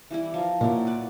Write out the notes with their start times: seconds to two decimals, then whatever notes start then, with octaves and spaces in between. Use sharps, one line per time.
0.11 E3 G3 E4
0.34 F3 A#4
0.61 A#2 F#3 E4
0.87 B4 D5